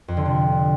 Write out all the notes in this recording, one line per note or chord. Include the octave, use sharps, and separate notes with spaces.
F2
D3
C3